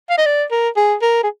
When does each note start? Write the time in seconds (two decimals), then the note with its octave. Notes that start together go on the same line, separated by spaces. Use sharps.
0.10 F5
0.18 D#5
0.26 D5
0.51 A#4
0.77 G#4
1.02 A#4
1.23 G#4